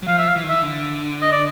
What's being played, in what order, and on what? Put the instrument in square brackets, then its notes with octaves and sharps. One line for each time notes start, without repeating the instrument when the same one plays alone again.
[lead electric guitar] F#3
[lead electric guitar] F3 [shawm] F5
[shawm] E5
F5
[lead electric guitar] E3
D#3
[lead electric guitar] E3 [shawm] E5
[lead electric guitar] D3
[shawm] D#5
D5